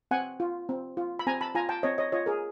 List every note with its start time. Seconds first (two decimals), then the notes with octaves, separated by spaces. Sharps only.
0.11 C4 F#5 G#5
0.40 F4
0.69 C4
0.97 F4
1.19 B5
1.27 C4 G#5 A#5
1.41 A5 B5
1.55 F4 G#5 A#5
1.69 G5 A5
1.83 C4 C#5 D#5
1.98 C#5 D#5
2.12 F4 C#5 D#5
2.26 G#4 A#4